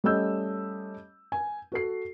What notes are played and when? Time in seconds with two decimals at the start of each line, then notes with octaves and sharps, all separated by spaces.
0.04 G3 A3 C#4 D#5 E6 G6
1.32 G#5
1.72 F#4 A4 C7